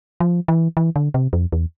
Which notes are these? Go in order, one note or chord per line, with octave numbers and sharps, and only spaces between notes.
F3
E3
E3
D3
C3
F2
E2